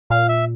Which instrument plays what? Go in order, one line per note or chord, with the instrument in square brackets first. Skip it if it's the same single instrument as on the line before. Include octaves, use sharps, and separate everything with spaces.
[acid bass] A#2 [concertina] F5
[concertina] E5